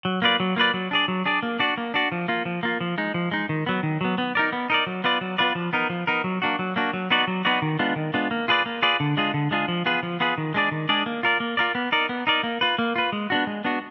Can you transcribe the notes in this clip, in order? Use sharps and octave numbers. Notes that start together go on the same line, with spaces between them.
F#3
A#3 F4 B4 D5
F#3
A#3 F4 B4 D5
F#3
D4 G#4 D5
F#3
D4 G#4 D5
A#3
D4 F#4 D5
A#3
D4 F#4 D5
F3
A#3 F4
F3
A#3 F4
F3
G#3 D#4
F3
G#3 D#4
D#3
F#3 B3
D#3
F#3 B3
B3
D#4 A#4 D5
B3
D#4 A#4 D5
F#3
B3 F4 B4 D5
F#3
B3 F4 B4 D5
F3
B3 D#4 A#4
F3
B3 D#4 A#4
F#3
A#3 D4 F#4
F#3
A#3 D4 F#4
F#3
B3 D#4 F#4 D5
F#3
B3 D#4 F#4 D5
D#3
G#3 B3 D4 F4
D#3
G#3 B3 D4 F4
A#3
F4 G#4 B4 D5
A#3
F4 G#4 B4 D5
D3
G#3 D4 F4 G#4
D3
G#3 D4 F4 G#4
F3
B3 F4 G#4 B4
F3
B3 F4 G#4 B4
D#3
G#3 D4 G#4 D5
D#3
G#3 D4 G#4 D5
A#3
F4 A#4 D5
A#3
F4 A#4 D5
B3
D#4 A#4 D5
B3
D#4 A#4 D5
A#3
F4 B4
A#3
F4 B4
G#3
B3 D4 F#4
G#3
B3 D4 F#4